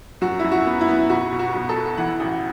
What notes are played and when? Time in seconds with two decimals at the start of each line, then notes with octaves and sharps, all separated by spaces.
0.21 F#2 F#4
0.39 F#2 E4
0.52 F#4
0.66 B3
0.81 E4
0.87 B3
1.10 B1 F#4
1.32 B2
1.39 F#4
1.54 B1
1.69 A4
1.76 B2
1.97 E3 F#5
2.20 A1